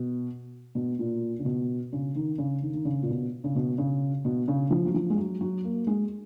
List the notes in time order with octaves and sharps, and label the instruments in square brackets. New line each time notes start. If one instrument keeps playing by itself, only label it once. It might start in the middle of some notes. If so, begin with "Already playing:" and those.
Already playing: [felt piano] B2
B2
A#2
C#3
B2
C#3
D#3
C#3
D#3
D#3
C#3
A#2
B2
C#3
B2
C#3
B2
C#3
F3
F#3
F3
G#3
F#3
F#3
A#3
G#3